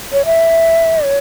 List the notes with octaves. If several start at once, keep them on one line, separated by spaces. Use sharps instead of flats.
C#5
E5
C#5